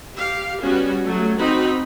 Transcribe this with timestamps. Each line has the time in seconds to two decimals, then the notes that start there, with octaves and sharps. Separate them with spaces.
0.15 G4 F5
0.61 G3 B3 C#4 F#4
1.04 F#3 A3
1.37 C4 D#4 F#4 B5